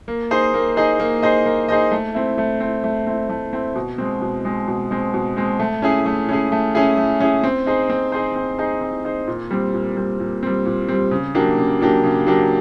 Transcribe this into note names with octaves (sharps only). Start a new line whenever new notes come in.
A#3
D#4 G#4 C5 D#5
A#3
D#4 G#4 C5 D#5
A#3
D#4 G#4 C5 D#5
A#3
D#4 G#4 C5 D#5
A3
C4 E4
A3
C4 E4
A3
C4 E4
A3
C4 E4
B2
G#3 C4
B2
G#3 C4
B2
G#3 C4
B2
G#3 C4
A3
C#4 E4 G#4
A3
C#4 E4 G#4
A3
C#4 E4 G#4
A3
C#4 E4 G#4
C4
D#4 G#4 C5
C4
D#4 G#4 C5
C4
D#4 G#4 C5
C4
D#4 G#4 C5
A#2
G3 C4
A#2
G3 C4
A#2
G3 C4
A#2
G3 C4
C#3
F#3 A#3 D4 G4
C#3
F#3 A#3 D4 G4
C#3
F#3 A#3 D4 G4